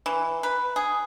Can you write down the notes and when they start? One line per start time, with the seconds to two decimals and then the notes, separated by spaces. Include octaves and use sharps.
0.06 E3
0.43 B4
0.76 G#4